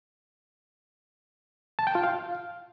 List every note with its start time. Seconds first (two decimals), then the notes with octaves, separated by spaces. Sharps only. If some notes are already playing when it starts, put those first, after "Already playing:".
1.79 A5
1.87 G5
1.95 F4
2.03 F5